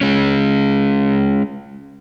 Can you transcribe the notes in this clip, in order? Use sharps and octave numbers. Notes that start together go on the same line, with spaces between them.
G#3 C#4